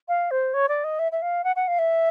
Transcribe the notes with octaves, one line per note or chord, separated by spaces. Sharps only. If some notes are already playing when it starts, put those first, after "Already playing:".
F5
C5
C#5
D5
D#5
E5
E5
F5
F#5
F#5
F5
E5